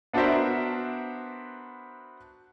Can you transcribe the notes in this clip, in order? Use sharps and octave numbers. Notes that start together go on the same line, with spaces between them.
B3 D4 F#4 A#4 C5 E5